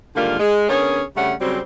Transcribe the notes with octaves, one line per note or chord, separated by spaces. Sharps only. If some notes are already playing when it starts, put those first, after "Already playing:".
G#2 D3 D#3 G3 A#3 F4
G#3
D3 B3 C#4 G#4 A#4 C#5
C#3 G3 A3 C#4 D4 F#5
C#3 F#3 G3 C4